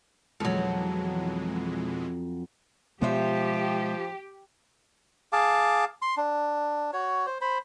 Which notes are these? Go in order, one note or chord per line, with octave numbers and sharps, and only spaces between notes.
F2 B2 E3 F#3 G#3
B2 F3 G#3 B3 G4 C5 C#5 E5
G#4 F5 A5 D6
C6
D4
F#4 C#5
C5
C5 B5